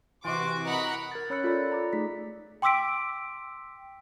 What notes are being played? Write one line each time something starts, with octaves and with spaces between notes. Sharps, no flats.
C3 E3 F#4 C6 D6
A#4 D#5 F#5 B5
A#4 G#6 A6
C#4 C#5 B5 E6 F#6 C#7
F4 A4 D5 B5 A6
D5 A#5 D6
A3 D#4 G#4 B6
G5 C6 D6 E6 B6 D7